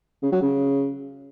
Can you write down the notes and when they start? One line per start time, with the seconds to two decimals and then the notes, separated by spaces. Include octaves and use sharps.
0.23 C#3
0.32 F#3
0.42 C#3